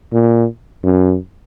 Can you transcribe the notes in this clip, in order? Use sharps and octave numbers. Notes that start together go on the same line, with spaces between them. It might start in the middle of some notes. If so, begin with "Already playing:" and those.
A#2
F#2